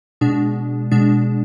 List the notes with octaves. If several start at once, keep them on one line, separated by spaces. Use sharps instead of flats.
B2 G#3 D4
B2 G#3 D4